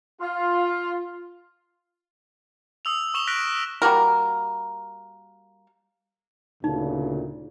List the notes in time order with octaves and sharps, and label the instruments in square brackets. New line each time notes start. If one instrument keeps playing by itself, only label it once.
[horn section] F4
[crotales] D#6 E6 F7
C#6 D#6 E7 F7 G7
F6 F#6 A#6 B6 D7
[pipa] G3 A#3 F#4 A#4
[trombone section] D2 A#2 C#3 [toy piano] D#4